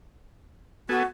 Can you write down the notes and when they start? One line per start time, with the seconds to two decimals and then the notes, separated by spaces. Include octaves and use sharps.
0.89 B3 F#4 A4 G#5